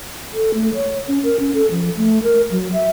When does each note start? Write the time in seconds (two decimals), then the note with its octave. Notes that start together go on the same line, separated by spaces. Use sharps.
0.34 A4
0.54 A3
0.74 C#5
1.08 C#4
1.24 A#4
1.39 C#4
1.55 A4
1.71 F3
1.97 A3
2.23 A#4
2.51 F#3
2.73 E5